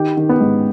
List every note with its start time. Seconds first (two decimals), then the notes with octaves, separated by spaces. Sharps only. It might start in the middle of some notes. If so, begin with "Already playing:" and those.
Already playing: D#3 G4
0.17 D#3
0.29 B3
0.41 G#2